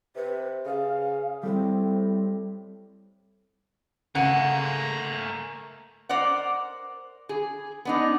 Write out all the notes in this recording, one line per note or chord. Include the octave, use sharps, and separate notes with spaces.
C3 B4
C#3 F5
A2 G3 C4
C#3 A3 A#3 F#5 G#5 A#5
A#4 C5 D5 F#5
G#4
B3 D4 D#4